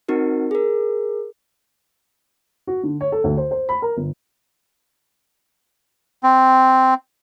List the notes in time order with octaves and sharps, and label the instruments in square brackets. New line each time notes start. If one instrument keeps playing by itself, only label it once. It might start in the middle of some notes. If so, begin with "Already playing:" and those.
[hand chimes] C4 D#4 F#4 A#4
G#4 A#4
[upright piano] F#4
D3
C#5
A4
D2
C5
C5
B5
A#4
G1
[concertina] C4